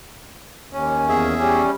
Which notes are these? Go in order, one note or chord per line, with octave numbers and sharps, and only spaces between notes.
D#2 C#4
E2 G#4 E5
G3 C#4